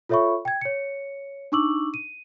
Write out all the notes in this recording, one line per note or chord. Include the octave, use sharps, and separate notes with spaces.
F4 A4 C#5 E5 B5 C#6
G5 G#6
C#5 C#7
D4 D#4 C#6 D6 E6 F#7
D#7